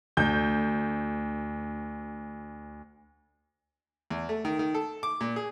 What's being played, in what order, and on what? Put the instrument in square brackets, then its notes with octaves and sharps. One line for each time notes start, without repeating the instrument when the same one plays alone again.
[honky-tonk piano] D2 G6
[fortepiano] E2
A3
D#3
D#3
A4
D6
A#2
G#4